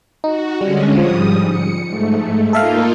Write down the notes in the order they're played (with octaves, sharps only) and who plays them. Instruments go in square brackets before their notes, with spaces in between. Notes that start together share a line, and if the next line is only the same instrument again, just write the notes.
[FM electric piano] D#4 [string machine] F#4
[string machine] D3 G#3 C#4 [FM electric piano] G3
[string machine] G#2 G3 D#6 [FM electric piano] F3
[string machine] C#7
G#2 A3
[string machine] A#3 D#4 F4 [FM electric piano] A4 E5 F5